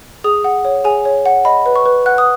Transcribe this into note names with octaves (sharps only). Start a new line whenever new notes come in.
G#4 D#6
F#5
C#5
G#4 G#5
C#5
F#5
D#5 B5
B4
C#6
B4
F#5 F#6
D#6